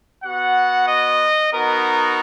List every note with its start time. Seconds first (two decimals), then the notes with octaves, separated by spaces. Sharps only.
0.23 B3 F#4 F#5
0.88 D#5
1.52 B3 D#4 F#4 A#4